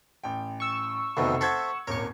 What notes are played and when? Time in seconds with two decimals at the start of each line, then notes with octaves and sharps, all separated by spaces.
0.24 A1 G5
0.60 C#6 E6
1.17 F1 D2 B2 D#3 D#4 F#4
1.41 A4 C5 E5 F#5 G#6
1.87 D#1 G#1 A#4 C#5 C#6